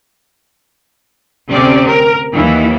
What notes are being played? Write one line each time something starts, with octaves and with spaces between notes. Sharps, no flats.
D2 C3 C4 C#4 D5
A#4
D#2 E3 F#3 E4